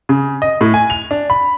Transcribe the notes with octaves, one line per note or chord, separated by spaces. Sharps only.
C#3
D#5
A2
G#5
F7
D4
B5